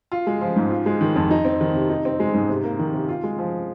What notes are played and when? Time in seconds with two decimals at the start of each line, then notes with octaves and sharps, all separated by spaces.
0.12 F4
0.27 G#3
0.41 F3
0.56 G#2
0.70 F4
0.86 G#3
1.01 D#3
1.16 F2
1.31 D#4
1.45 C4
1.61 D#3
1.75 C3
1.90 D#4
2.05 C4
2.20 G#3
2.34 G#2
2.49 C3
2.64 A#3
2.79 D#3
2.94 C3
3.08 F4
3.24 G#3
3.39 F3